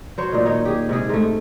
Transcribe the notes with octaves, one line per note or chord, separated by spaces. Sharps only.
F#3 C5 C#5
A#2 D#3
D#4 C#5
G4 G#4
G#2 C3 G#4
G#2 A3